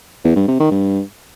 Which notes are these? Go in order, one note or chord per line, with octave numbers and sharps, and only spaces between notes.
E2
G2
C3
D#3
G2